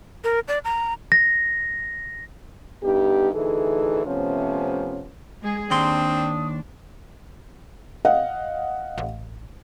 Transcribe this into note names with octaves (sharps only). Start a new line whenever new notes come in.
A#4
D5
A#5
A#6
G2 D3 B3 D#4 G4
D2 E3 D#4 G#4 A4
C3 F3 A3 B3 C#4
G#3 G#4
D#2 C4 D4 C6 D#6
D#5 F5 F#5
A1